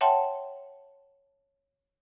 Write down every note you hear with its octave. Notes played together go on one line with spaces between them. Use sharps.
C#5 E5 F#5 G5 A5 C6